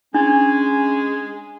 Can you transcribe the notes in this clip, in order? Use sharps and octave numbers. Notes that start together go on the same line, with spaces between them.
G#3 C#4 D4 G#5